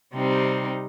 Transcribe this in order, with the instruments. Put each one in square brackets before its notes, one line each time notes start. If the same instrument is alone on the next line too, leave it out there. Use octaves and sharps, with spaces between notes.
[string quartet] C3 G3 C4 D#4